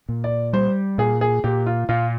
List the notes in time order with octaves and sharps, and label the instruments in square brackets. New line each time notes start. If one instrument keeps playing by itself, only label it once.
[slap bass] A#2
[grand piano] D5
[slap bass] G3 [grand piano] C5
[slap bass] A#2 [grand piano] G#4
[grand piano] G#4
[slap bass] A#2 [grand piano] G4
[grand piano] F4
[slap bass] A#2 [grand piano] F4